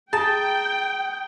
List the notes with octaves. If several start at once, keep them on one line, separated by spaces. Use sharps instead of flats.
G#4 G5 A5 A#5